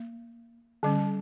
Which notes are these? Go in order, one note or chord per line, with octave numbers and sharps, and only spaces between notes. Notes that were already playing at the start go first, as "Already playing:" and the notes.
Already playing: A#3
D3 G3 C#4